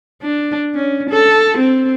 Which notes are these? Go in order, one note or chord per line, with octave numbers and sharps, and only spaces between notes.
D4
C#4
A4
C4